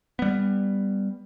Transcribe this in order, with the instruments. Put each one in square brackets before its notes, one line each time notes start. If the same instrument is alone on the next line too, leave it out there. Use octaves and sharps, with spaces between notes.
[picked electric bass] G3 B3